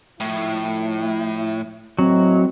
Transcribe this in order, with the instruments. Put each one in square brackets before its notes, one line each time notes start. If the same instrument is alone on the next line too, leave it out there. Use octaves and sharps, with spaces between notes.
[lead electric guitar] A2 [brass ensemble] F3 D#4 E4
[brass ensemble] A2 D#5 [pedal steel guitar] F#3 [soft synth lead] C4